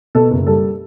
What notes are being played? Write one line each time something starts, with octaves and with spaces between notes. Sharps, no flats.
B2 A4
F#1
G3 A4